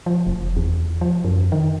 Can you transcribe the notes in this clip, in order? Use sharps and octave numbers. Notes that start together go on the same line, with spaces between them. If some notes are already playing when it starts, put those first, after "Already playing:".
F3
F1
E2
F3
F#2
D#3